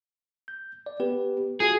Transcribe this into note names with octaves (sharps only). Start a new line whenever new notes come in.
G6
D5
B3 G4 B4
F4 F#4 G#4